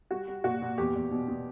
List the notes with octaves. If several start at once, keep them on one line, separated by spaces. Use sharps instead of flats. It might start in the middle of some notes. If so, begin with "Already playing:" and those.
G3 F#4
G3
A#2 F#4
A#2
E2 G4
E2
B2
B2